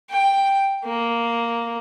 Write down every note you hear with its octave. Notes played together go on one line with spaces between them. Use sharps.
G5
A#3